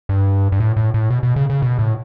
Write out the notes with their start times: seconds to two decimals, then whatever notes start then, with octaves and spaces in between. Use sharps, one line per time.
0.09 G2
0.52 G2
0.60 A2
0.77 A2
0.94 A2
1.10 B2
1.23 B2
1.36 C#3
1.50 C#3
1.62 B2
1.79 A2